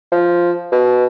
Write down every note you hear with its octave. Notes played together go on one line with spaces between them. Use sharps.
F3
B2